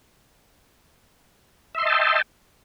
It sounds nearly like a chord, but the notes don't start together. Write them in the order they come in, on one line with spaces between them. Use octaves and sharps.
E5 C6 D#5 A5 G5